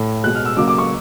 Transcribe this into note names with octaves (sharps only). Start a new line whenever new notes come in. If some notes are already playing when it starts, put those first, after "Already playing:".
Already playing: A2
B2 G#3 F#6
F6
E6
C#3 F#3 A#3 D6
D6
C#6